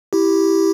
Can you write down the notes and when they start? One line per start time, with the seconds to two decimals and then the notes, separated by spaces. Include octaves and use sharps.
0.13 E4 G4